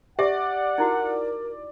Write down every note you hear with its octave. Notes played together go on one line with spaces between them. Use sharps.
G4 D5 E5 F#5
D#4 E4 F#4 A#4